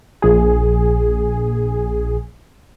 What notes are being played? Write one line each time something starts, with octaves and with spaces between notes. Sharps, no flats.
A#1 G#4